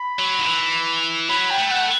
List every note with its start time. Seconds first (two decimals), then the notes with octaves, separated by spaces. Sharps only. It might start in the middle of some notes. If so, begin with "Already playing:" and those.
Already playing: B5
0.19 F#3
0.40 D#3
0.47 E3
1.29 F#3 B5
1.51 G5
1.57 A3
1.71 F#5